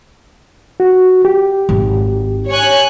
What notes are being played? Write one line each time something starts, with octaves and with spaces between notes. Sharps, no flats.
F#4
G4
G#1
C#5 G#5 F#6